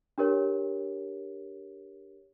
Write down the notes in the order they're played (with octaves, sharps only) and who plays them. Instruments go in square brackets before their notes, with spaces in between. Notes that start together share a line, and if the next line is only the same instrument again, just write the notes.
[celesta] D4 G4 A#4 C#5